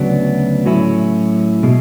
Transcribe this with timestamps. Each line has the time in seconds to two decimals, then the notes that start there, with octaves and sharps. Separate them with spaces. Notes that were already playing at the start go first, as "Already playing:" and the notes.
Already playing: D2 C#3 F#3 B3 D4
0.66 A2 F#3 C#4 E4
1.63 B2 G#3